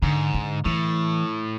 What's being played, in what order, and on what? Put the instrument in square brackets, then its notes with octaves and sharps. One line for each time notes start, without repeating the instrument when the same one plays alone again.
[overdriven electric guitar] G#2 [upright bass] D3
[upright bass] D3
[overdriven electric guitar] A2 [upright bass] E3